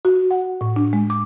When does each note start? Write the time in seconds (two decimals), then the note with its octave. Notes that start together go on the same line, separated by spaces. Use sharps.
0.05 F#4
0.31 F#5
0.61 A2
0.76 D4
0.93 G#3
1.10 D6